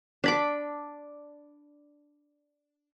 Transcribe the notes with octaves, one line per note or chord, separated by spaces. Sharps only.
D4 B5 D6